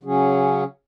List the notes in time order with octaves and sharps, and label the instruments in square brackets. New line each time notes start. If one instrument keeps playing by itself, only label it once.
[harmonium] C#3 F#3 C#4 G#4